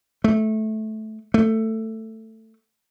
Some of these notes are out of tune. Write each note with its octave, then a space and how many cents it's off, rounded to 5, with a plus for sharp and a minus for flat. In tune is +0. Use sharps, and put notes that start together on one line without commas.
A3 -15
A3 +15